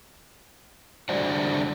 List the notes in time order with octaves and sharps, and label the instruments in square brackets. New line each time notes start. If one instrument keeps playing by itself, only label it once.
[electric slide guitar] D3 G3 C5 D5 F#5